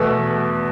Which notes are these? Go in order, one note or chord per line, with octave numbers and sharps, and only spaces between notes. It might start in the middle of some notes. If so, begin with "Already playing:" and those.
Already playing: E2 B2 A3